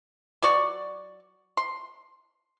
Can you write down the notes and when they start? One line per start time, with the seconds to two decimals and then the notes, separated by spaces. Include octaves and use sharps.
0.42 F#3 F#4 D5 C#6
1.57 C6